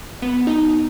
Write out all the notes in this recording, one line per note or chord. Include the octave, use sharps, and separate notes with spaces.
B3
D#4